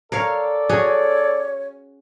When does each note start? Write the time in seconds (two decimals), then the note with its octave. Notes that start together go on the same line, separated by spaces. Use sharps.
0.12 A4 A#4 C#5 D5 F5
0.69 C#4 F#4 G#4 C#5